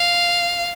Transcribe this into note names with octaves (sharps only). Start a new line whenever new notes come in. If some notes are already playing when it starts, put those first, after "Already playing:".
Already playing: F5